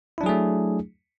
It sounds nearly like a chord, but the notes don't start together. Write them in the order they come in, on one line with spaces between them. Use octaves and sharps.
E4 D4 F#3 G#4 A3